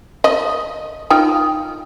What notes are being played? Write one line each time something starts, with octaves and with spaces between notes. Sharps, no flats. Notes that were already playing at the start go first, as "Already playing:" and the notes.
D#5
D#4 F4 G5